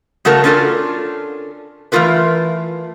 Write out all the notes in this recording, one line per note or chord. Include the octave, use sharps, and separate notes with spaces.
C#3 A3 F#4 A4 A#4
C#4 D4 F4 A4 A#4
E3 A3 C#4 F4 A#4 B4